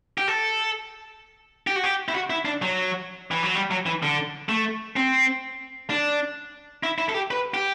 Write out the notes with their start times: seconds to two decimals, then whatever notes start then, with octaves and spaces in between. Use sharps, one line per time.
0.18 G4
0.28 A4
1.67 G4
1.76 F#4
1.84 G4
2.09 E4
2.15 F#4
2.30 E4
2.45 D4
2.62 F#3
3.31 E3
3.43 F#3
3.55 G3
3.71 F#3
3.86 E3
4.03 D3
4.49 A3
4.96 C4
5.90 D4
6.83 E4
6.98 E4
7.09 A4
7.14 G4
7.31 B4
7.54 G4